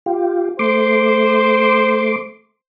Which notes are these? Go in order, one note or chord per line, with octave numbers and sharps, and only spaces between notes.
F4 G4
A3 C5 C6 D6